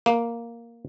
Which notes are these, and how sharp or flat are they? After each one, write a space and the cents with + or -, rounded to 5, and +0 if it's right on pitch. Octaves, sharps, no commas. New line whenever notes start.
A#3 +0